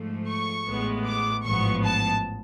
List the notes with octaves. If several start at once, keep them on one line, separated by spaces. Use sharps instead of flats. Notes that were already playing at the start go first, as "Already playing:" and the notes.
Already playing: G#2 F3 A3
C#6
A1 A2 G#3 B3
D6
A1 G#2 F3 B3 C#6
A5